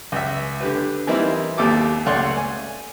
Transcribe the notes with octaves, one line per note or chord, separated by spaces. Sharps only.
C#2 E5
D3 G4 B4
E3 G3 A#3 C4 D#4 E4
G#1 D#2 G4 A4 D6
C#2 A3 C#5 D5 F#5 C6
G#5